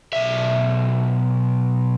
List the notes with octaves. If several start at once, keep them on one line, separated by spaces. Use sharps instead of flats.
B1 E5